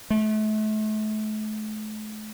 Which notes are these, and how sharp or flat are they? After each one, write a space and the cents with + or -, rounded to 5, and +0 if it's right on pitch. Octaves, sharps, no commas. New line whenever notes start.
A3 -35